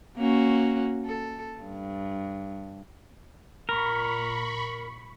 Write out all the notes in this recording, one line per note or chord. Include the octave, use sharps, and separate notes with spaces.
A#3 C#4 F#4
A4
G2
A#2 A#4 B5 C#6